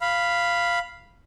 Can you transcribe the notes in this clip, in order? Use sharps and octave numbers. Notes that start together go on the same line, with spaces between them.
F5 B5